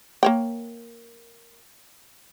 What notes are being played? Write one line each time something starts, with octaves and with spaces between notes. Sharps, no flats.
A#3 C#5 G5